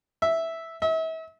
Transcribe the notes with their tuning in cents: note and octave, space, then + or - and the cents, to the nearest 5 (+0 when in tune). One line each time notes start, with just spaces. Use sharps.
E5 -5
E5 -40